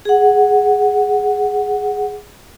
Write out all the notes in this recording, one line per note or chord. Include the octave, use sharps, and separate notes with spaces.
G#4 F#5